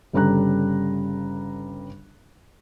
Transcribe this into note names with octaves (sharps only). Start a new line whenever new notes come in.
G1 C#3 G3 A4 A#5 F#6